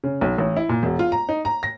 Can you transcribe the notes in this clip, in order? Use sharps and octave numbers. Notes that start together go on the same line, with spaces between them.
C#3
B1
A1
E4
A#2
E1
F4
A#5
D#4
A#5
A#6